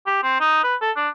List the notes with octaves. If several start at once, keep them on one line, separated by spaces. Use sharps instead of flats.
G4
C4
D#4
B4
A4
D4